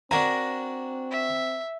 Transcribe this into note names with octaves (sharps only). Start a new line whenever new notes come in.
C4 D4 F#4 A#4 G#5 A#5
E5